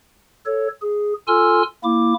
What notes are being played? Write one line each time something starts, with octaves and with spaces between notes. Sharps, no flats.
A4 C#5
G#4
F4 A4 G#5 C6 E6 F6
A#3 E4 D6